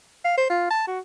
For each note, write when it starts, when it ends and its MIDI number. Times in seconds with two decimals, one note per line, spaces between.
0.25 0.36 77
0.37 0.45 72
0.50 0.67 65
0.70 0.83 81
0.87 0.99 66